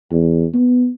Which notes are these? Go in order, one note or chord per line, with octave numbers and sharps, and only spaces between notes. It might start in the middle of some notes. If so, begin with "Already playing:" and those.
E2
B3